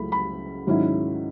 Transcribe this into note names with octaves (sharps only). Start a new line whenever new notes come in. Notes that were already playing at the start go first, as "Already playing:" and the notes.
Already playing: C#2 C#3 F#3 A3 E4 B5
B5
G#2 D#3 F#3 C#4 E4